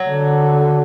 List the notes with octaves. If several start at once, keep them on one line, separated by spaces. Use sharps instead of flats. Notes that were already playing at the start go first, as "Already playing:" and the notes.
Already playing: F#3
D3